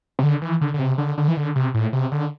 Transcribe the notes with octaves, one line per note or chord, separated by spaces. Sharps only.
C3
D3
E3
D3
D3
C3
D3
D3
E3
D3
C3
A2
C3
D3